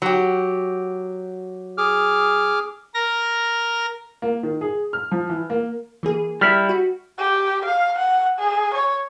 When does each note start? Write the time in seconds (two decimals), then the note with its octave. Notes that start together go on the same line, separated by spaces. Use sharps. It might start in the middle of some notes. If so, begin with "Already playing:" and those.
0.02 F#3 G4
1.78 G#4 D6 F6
2.94 A#4 A#6
4.22 A#3
4.43 D#3
4.61 G#4
4.93 F6
5.11 F3
5.29 E3
5.50 A#3
6.03 E3 A#3 G#4
6.41 G3 E4 F6 B6
6.69 F#4
7.18 G4
7.66 F5
7.98 F#5
8.39 G#4
8.75 C#5